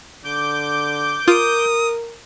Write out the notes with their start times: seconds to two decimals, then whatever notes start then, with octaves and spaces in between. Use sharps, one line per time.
0.25 D3 D6 G6
1.28 F4 A#4 D#6 D7